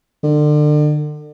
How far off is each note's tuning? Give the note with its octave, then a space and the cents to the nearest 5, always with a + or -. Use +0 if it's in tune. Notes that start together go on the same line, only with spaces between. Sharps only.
D3 +35